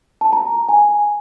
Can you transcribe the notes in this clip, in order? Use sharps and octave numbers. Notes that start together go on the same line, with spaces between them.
A5
A#5
G#5